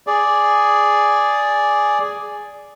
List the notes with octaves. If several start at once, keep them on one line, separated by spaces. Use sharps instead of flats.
G#4 D5